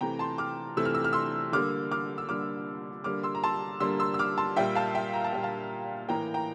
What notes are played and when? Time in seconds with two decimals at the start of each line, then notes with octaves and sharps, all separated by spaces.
0.01 C3 E3 A3 G5 A#5
0.19 A5 C6
0.38 D6 F6
0.77 C3 E3 A3 E6
0.85 F6
0.94 E6
1.04 F6
1.13 C6 E6
1.52 D3 G3 A#3 D6 F6
1.92 D6 F6
2.18 E6
2.28 D3 G3 A#3 D6 F6
3.04 D3 G3 A#3 D6 F6
3.23 C6 E6
3.35 A#5
3.44 A5 C6
3.80 D3 G3 A#3 C6 E6
4.00 C6 E6
4.14 E6
4.19 D6 F6
4.38 A5 C6
4.56 A#2 G3 A#3 E5 G5
4.75 F5 A5
4.95 E5 G5
5.13 A#5
5.24 A5
5.33 A#2 G3 A#3 G5
5.43 F5 A5
6.08 A2 E3 A#3 G5 A#5
6.34 G5 A#5